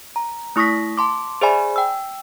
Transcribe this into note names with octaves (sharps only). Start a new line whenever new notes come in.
A#5
A3 E4 C#6 D#6 A#6 B6
A5 C6 D6
G#4 C5 D5 E5 G#5 B5
G5 E6